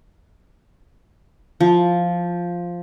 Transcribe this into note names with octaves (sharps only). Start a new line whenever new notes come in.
F3